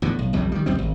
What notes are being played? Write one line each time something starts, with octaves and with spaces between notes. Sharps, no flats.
E2 A2 D3
B1
B1 F2 C#3 G3
D#3 G3
C#2 F#2 G3 C4
G#1